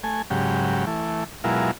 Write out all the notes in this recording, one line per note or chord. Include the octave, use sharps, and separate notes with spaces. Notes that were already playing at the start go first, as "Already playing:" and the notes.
A3 G#5
G#2 C#3 F#3 G4
E3 A3
B2 F#3 G#3 E4 F4 A#4